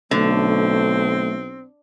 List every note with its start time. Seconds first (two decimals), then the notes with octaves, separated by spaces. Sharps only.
0.11 B1 D3 A3 C4